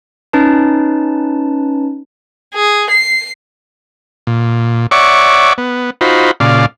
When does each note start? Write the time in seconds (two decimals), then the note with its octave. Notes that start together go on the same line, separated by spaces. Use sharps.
0.33 C#4 D#4 B4 A5
2.55 G#4
2.90 C7
4.27 A#2
4.91 C#5 D5 E5 F#5 C#6 D6
5.58 B3
6.01 D#4 F4 F#4 C5 B5
6.40 A#2 C#3 D5 F5